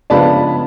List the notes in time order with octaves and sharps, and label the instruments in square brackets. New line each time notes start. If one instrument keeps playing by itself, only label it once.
[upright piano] C#3 F3 G#3 B3 D4 A5 B5